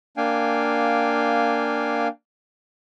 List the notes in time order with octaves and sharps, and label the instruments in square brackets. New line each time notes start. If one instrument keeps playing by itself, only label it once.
[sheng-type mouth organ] A#3 D4 F5 G5 G#5